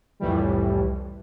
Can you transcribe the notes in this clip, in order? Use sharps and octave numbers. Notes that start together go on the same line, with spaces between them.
C2 F2 A2 E3 G3